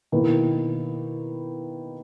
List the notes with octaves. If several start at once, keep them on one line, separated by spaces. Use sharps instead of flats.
B2 D#3 A#3 E4 B4